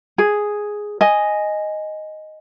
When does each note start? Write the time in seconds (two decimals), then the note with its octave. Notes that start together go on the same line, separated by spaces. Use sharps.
0.18 G#4
1.01 D#5 G#5